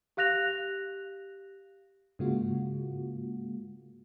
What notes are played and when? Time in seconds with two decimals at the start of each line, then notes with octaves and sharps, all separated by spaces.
0.17 G4 F5 F#6 A#6 F7
2.19 G#2 C#3 G#3 A#3 F4 F#4